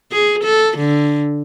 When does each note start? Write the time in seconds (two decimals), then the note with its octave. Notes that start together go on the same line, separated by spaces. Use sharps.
0.12 G#4
0.44 A4
0.78 D3